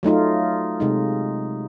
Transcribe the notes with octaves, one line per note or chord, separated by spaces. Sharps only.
F#3 A3 D#4 F4
C3 G#3 D#4